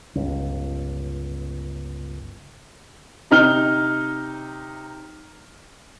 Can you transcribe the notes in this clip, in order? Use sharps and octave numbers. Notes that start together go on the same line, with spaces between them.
G1 C#2
C3 D#4 F6 G7